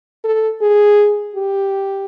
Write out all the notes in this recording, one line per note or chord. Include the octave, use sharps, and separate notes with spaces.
A4
G#4
G4